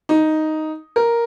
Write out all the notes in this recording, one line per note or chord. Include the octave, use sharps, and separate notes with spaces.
D#4
A#4